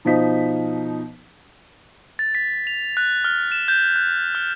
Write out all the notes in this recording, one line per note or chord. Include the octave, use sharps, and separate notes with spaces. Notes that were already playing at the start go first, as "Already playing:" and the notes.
B2 F3 D#4 B6
A6
B6
F7
F#6
F6
E7
G6
F#6
F6